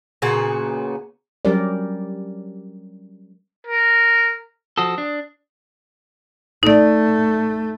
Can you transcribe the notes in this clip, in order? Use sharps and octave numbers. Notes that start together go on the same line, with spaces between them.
A#2 C#3 B3 F#4
F#3 G3 C#4 G4 A#4 D5
A#4
F3 F#4 A4 D#6
D4
A3 D#4 D5